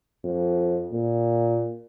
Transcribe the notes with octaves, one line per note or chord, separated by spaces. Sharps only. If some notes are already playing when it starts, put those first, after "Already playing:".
F2
A#2